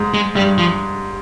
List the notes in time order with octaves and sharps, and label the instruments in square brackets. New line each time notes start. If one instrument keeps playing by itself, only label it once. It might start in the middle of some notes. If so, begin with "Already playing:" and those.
Already playing: [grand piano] G#2
[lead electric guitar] G#3
[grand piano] G2 [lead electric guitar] G3
[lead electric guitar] F3